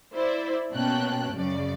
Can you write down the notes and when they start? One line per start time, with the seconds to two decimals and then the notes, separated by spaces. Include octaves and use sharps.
0.14 E4 C5 D5 E5
0.73 B2 A#3 C#4 G5 A5 F#6
1.33 F#2 C#3 D5